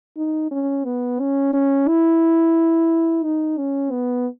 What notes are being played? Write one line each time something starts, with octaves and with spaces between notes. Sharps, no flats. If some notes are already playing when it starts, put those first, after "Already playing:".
D#4
C#4
B3
C#4
C#4
E4
D#4
C#4
B3